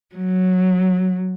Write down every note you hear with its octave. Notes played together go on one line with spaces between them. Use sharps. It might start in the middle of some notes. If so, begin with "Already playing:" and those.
F#3